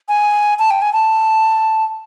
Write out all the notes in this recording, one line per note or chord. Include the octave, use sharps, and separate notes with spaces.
G#5
A5
G5
G#5
A5